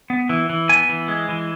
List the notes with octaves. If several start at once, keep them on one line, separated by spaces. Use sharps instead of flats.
B3
E3
E3
B3 G#5
E3
G#3
E3